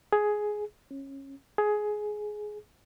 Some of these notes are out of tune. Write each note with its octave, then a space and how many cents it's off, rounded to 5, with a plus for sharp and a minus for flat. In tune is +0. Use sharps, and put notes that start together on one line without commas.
G#4 +10
C#4 -20
G#4 +15